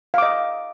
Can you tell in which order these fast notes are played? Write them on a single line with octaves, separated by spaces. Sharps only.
F5 D6 D#5